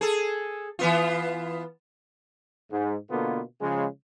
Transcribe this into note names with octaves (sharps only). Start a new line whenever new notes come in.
G#4 A4
E3 B3 F4
G#2
B2 D3 A#3 B3 F4 A4
C#3 F3 G#3